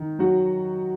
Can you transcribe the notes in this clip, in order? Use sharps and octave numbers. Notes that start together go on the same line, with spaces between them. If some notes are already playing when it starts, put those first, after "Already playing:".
Already playing: D#3
F#3 F#4